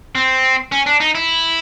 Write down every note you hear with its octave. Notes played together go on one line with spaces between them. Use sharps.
C4
C#4
D4
D#4
E4